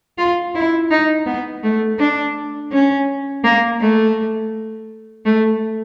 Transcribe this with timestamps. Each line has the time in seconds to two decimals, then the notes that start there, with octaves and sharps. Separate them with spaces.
0.18 F4
0.55 E4
0.91 D#4
1.26 B3
1.63 A3
1.99 D4
2.72 C#4
3.44 A#3
3.80 A3
5.25 A3